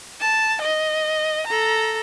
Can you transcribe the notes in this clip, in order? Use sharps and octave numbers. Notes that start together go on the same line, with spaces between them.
A5
D#5
A4 A#5